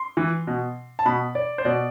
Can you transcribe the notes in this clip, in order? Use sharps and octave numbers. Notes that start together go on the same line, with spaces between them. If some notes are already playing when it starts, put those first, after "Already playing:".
Already playing: C6
E3
B2
A5
B2 B5
D5
C5
B2 D5